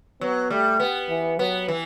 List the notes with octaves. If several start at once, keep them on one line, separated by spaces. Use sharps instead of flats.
F#3 B3
G3 A3
B3
E3
F#3 B3
E3